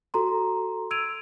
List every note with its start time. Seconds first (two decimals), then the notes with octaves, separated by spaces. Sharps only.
0.14 F#4 A4 A#5 C6
0.91 E6 G#6 D7 D#7 F7